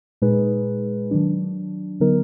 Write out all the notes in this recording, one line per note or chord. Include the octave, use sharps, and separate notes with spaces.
A#2 G#3 D#4 G#4 B4
D#3 F#3 D4
D3 F#3 B3 D#4 A#4